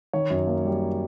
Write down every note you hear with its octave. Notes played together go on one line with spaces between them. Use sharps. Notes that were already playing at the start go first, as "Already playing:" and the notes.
D#3 C#5
F#2
A#3
G3